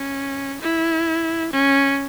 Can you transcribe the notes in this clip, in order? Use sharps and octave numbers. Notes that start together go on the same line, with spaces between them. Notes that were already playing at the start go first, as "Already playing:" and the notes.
Already playing: C#4
E4
C#4